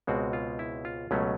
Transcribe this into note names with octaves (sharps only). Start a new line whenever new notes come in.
C#2 B2 G#3 C4 F#4
F4
E4
F4
C#2 B2 F#3 A3 C#4